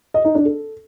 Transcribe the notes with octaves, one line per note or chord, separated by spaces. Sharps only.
D#5
D#4
D4
A4